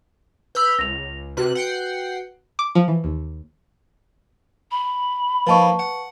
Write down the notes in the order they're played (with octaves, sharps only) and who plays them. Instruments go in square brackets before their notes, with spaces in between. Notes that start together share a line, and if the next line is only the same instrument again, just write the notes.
[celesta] B4 E6 [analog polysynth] B5 F6 G6
[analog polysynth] C#2 [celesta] A#6 F7
[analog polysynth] C3 F#6 [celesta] F#4 B4
[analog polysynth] F#5 G5 C7
[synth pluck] D6
F3
E3
D#2
[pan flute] B5
[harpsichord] F3 A#3 D#4 [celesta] B4 A5 C#6
[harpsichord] F#5